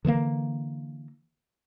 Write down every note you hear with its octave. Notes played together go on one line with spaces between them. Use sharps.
D3 E3 A3 A#3